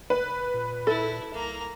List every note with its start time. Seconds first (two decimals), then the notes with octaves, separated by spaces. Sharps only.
0.10 F1 B4
0.54 A#2
0.87 E4 A4
1.34 C2 A#3 A#5